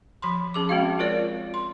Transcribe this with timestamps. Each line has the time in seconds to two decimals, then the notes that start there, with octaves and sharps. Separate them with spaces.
0.22 F3 B5 C6
0.54 C#4 G#4 D6
0.69 G#3 C4 C#4 F#4 F5
0.99 F4 A#4 C#5 D5
1.54 C6